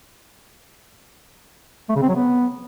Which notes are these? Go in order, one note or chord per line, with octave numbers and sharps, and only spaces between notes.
A3
C#3
C4
F#3
B3